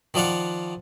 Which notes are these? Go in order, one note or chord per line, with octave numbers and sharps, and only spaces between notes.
D#3 F3 D5 F5 F#5